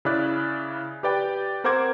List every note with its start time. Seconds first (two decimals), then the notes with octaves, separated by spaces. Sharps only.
0.05 C#3 E4 G#4 D5 F#6
1.03 G4 B4 D5 G5
1.64 C4 A#4 C5 F#5 D6 G#6